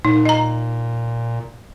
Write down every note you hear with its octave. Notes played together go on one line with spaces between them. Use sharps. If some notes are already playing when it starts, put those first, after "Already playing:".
A#2 D#4
D#5 A#5